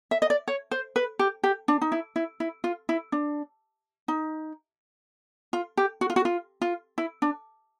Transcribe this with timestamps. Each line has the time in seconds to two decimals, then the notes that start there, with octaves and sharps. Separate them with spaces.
0.11 E5
0.22 D#5
0.30 D5
0.48 C#5
0.71 C5
0.96 B4
1.19 G4
1.43 G4
1.68 D4
1.81 D#4
1.92 E4
2.16 E4
2.40 E4
2.64 F4
2.89 E4
3.12 D4
4.08 D#4
5.53 F4
5.77 G4
6.01 F#4
6.10 F4
6.16 F#4
6.25 F4
6.62 F4
6.98 E4
7.22 D4